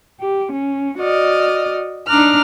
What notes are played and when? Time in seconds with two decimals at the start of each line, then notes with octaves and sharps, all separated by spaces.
0.19 G4
0.51 C#4
0.97 F#4 D5 D#5 F6
2.06 D4 D#4 A#5 D6 F6 F#6